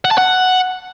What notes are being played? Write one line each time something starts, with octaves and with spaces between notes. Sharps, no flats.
F#5
A5
F#5